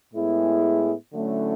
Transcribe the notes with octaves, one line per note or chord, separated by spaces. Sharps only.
A2 G#3 B3 E4 G#4
D3 F#3 A3 C#4 E4